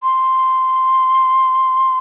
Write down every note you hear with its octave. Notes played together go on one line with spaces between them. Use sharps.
C6